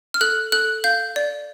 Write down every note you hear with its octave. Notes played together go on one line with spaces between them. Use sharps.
F6
A4 F#6
A4 F#6
F5 G6
D5